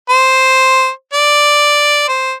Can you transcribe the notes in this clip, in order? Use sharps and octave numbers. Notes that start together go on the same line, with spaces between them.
C5
D5
C5